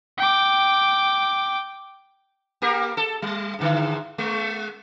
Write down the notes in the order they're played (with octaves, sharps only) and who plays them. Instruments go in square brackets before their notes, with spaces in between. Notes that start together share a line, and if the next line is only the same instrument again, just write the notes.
[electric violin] G5 D6
[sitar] A#3 G4 A#4
A4
G3
G#2 D3 E4
G#3